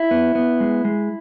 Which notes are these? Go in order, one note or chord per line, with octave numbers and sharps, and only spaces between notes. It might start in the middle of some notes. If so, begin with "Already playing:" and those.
Already playing: E4
B3
B3
G#3
G#3